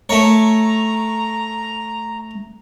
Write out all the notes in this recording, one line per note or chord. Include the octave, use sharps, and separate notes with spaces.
A3 C#5 A#5